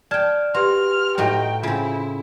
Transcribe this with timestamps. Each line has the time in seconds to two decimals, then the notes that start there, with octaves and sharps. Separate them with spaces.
0.11 D5 G5 A5 F6 G#6
0.54 F#4 G4 B4 C6 F6
1.18 A2 D#4 F#4 G5
1.63 C#3 C4 E4 F4